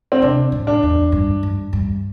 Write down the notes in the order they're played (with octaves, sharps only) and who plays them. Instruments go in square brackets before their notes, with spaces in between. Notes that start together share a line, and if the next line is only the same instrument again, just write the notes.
[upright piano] C4
[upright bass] C3 [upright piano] D4
[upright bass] A2
[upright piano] D4
[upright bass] E2
G2
G2
G2